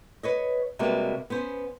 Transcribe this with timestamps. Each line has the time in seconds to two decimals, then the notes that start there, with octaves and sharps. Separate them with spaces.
0.23 B4 C#5 D#5
0.79 C3 G3 G#3 A#3 F#4 B4
1.30 B3 C#4 C5